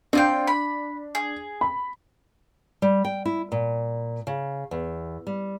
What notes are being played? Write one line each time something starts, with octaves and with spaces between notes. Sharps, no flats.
C4 D4 F4 G5
B5
G#4
B5
G3
G5
E4
A#2
C#3
E2
G3